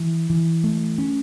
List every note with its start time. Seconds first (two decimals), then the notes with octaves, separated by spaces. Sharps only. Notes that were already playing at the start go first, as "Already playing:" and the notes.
Already playing: E3
0.30 E3
0.64 A3
0.98 C#4